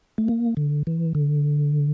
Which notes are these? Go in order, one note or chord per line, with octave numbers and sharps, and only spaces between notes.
A3
A#3
D3
E3
D3